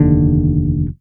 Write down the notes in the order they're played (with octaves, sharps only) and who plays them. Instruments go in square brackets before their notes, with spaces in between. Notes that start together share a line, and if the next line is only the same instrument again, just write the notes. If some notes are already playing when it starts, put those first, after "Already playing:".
Already playing: [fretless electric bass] F1 D#2 D3